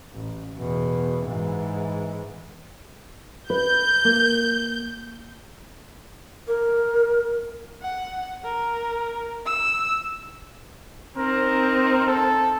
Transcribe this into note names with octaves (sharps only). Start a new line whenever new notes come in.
A1
E2 B2
G#2 E3
B4 G6
A#3
A#4
F#5
A#4
E6
C4 D#4 A#4
A4